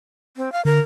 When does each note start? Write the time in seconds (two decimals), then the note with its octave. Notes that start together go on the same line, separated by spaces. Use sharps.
0.37 C4
0.52 F5
0.65 D3 A#4